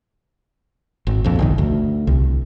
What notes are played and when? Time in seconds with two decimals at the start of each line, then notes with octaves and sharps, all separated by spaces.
1.07 G#1
1.24 A#1 F2
1.39 G1 C2 D#3
1.58 D2
2.07 C2